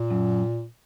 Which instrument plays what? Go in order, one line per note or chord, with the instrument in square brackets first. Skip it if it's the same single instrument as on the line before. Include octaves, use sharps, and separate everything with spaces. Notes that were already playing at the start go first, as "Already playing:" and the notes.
Already playing: [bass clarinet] A#2
[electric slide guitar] F#2